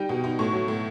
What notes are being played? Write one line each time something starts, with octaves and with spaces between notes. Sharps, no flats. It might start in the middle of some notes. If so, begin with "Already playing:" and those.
Already playing: G3 D#4 G5
B2
D#4
A2 C#6
F#3
A2